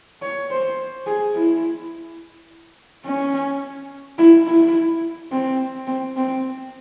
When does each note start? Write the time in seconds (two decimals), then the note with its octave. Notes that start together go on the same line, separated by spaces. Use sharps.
0.22 C#5
0.51 C5
1.07 G#4
1.35 E4
3.05 C#4
4.18 E4
4.47 E4
5.32 C4
5.87 C4
6.16 C4